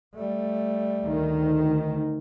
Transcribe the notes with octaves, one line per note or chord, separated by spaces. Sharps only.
G3 A3
D2 D#3